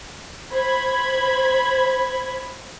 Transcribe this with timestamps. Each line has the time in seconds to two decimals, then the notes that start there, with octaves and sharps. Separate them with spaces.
0.52 C5 B5 G#6